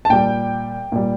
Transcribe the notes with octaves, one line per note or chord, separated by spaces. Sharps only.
A5
A#2 G3 G5
A#2 G3